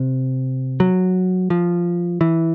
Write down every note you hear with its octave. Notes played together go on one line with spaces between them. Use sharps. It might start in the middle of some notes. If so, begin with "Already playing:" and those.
Already playing: C3
F#3
F3
E3